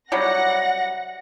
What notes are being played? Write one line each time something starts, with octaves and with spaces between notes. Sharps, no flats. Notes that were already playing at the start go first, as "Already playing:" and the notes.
C3 F#3 G3 F#5 A#6